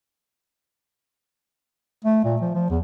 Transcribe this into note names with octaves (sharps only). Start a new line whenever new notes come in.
A3
A#2
F3
F3
E2